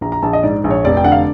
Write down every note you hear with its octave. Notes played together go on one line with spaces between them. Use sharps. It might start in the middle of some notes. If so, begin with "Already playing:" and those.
A#1 A#5
A#5
A#1 A5
D#5
G#2 D5
A#1
C#5
F1 D5
G5
D3 F#5
F5